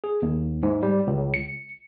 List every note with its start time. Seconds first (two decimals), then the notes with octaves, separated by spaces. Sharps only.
0.04 G#4
0.22 D#2
0.63 G#2
0.83 G3
1.07 C#2
1.34 C#7